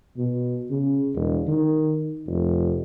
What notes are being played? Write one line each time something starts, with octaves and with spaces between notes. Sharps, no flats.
B2
C#3
E1
D#3
F1